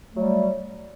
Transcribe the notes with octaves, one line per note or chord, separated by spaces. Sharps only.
F#3 G3 A3